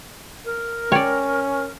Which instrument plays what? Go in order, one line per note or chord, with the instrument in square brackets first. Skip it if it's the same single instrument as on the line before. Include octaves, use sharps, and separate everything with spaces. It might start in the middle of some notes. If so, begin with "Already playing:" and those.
[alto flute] A#4
[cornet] C#4 [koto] C#5 D5 [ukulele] G5